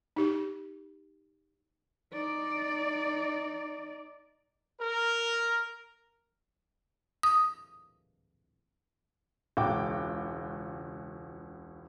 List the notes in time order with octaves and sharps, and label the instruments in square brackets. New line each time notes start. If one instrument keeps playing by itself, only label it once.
[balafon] D#4 G4
[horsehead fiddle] D#4 D5
[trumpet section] A#4
[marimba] D#6
[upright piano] E1 C#2 F#4 G5 D6